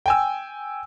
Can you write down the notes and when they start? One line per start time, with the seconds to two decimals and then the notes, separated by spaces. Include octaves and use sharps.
0.06 G5 G#5 E6